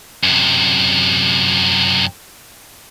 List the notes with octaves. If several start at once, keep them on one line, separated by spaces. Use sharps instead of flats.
F#2 C3